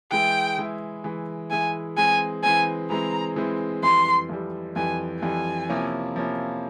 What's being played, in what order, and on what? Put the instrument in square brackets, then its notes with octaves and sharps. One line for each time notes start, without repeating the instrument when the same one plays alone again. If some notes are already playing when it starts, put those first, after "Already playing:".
[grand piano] E3 G#3 E4 [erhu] G5
[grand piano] E3 G#3 E4
E3 G#3 E4
[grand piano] E3 G#3 E4 [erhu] G#5
[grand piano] E3 G#3 C4 [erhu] G#5
[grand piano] E3 G#3 C4 [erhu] G#5
[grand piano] E3 G#3 C4 [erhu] A#5
[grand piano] E3 G#3 C4
[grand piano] F2 E3 G3 [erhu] C6
[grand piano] F2 E3 G3
[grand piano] F2 E3 G3 [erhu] G#5
[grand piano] F2 E3 G3 [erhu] G#5
[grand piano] C3 F3 A#3 C#4 E4
C3 F3 A#3 C#4 E4